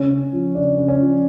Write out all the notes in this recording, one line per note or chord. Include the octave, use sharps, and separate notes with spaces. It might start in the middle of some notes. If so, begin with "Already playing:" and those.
Already playing: C#3 C#4
C#3
F3
C#3 D4
C#3
C#4
F3